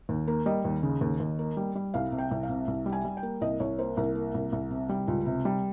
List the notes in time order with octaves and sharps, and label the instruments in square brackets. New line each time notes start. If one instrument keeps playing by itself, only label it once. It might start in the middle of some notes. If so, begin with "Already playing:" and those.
[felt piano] D#2
A#3
G3 D#5
D#2
C#3
D#2
D#2
A#3
G3
G3
C2 F5
C3
G5
C2
F5
C3
C2
G3
G#5
G3
G5
A#3
C2 D#5
C2 C#5
A#3 C5
C2 A#4
A#3
C2
C2
C3
G3
C#2
C3
G3